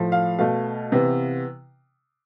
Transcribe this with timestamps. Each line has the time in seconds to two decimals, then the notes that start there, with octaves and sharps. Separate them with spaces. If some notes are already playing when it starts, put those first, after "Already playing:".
Already playing: A2 F3 A3
0.12 F5
0.38 B2 A3 F5
0.92 C3 E3 B3